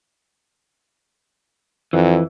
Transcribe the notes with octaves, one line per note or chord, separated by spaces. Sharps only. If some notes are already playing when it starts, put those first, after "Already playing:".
F2 E3